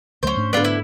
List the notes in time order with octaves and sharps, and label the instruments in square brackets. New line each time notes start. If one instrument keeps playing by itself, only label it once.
[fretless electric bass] D2 F#3 A3 [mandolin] C#4 C5
[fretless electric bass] G#2 A3 D4
[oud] D3 B3 [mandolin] F4 D5
[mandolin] E4